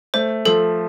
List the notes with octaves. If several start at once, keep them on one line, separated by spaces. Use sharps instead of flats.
A3 C5
F3 A4